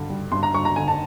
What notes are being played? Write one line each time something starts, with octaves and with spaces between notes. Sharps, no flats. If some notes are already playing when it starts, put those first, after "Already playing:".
Already playing: G2 D3
G3
G2 C6
A#5
G2 C#6
A#5
D3 G#5
A5